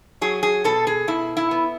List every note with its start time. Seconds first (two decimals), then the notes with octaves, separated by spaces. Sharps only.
0.21 F#3 G#4
0.43 G#4
0.64 B2 A4
0.87 G#4
1.08 B2 E4
1.37 E4
1.51 B3